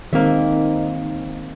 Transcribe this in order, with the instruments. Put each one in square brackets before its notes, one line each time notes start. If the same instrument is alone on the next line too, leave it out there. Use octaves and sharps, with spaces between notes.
[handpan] D#3 G#3 C4 [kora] A#3 E5 [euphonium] D#4